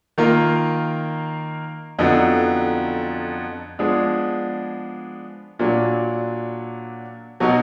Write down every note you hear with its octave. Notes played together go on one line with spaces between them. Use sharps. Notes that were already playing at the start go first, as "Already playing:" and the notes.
D#3 A#3 F4 A#4
F2 D3 F#3 B3 D#4
F3 G#3 B3 D4 G#4
A#2 F#3 D4
B2 F#3 B3 D#4 F#4